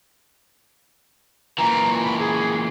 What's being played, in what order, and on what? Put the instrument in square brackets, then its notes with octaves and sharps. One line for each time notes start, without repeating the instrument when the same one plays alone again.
[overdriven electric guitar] A#2 E3 [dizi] A#5
[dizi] B5
G#4